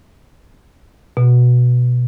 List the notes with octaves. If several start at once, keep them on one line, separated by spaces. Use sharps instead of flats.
B2